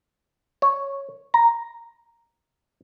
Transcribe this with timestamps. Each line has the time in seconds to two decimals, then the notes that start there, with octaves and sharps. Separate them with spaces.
0.62 C#5
1.34 A#5